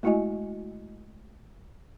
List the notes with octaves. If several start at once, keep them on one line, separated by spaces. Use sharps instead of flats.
G#3 A3 E4 F#4 D#5 G#5